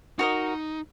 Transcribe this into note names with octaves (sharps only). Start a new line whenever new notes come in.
D#4 F#4 A#4 D#5